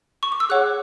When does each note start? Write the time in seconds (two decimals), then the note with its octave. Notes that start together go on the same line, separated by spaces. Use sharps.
0.23 C#6
0.32 D6
0.40 E6
0.49 G#4 C#5 F#5 F#6